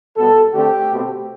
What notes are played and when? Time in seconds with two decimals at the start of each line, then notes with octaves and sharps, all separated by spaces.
0.16 B2 G3 B3 A4
0.53 D3 A3 C4 G4
0.90 B2 A3 C4